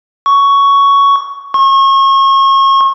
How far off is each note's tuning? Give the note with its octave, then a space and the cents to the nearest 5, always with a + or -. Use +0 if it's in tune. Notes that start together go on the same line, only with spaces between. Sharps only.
C#6 +10
C#6 -35